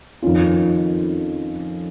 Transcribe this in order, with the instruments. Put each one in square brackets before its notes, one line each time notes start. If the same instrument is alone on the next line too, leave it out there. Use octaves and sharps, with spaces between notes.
[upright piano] F2 D#3 C#4 F4